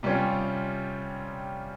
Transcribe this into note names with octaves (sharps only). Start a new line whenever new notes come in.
C3 G3 C#4 F4